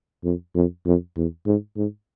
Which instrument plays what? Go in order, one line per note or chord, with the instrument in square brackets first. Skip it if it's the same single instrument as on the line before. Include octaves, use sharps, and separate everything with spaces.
[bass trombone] F2
F2
F2
E2
G#2
G#2